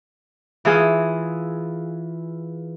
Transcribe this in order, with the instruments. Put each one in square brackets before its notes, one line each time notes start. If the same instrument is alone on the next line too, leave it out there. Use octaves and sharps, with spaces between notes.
[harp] E3 F4 G#4